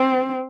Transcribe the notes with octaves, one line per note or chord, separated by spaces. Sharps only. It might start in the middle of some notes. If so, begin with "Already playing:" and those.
Already playing: C4